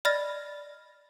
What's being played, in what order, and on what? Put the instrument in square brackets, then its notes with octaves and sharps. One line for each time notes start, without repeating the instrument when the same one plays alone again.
[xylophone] D5 D#5 B5 F6 A6 A#6